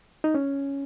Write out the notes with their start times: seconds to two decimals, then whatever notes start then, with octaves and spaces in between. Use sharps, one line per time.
0.24 D#4
0.35 C#4